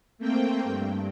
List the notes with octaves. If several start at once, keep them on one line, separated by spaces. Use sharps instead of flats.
A3 A#3 C4 G5
G2